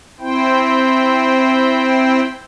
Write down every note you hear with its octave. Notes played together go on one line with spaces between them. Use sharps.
C4 E4 C5 G5